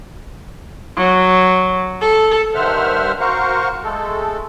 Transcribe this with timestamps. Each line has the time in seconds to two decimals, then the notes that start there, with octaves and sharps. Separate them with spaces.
0.97 F#3
2.01 A4
2.55 G2 D#3 C5 E5 F#5 F6
3.20 F#4 A#4 C5 F5 C#6
3.84 G#3 A3 A4